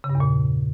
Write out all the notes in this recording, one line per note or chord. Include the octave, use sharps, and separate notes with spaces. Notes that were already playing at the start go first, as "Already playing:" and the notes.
C#3
G2
E2
A#2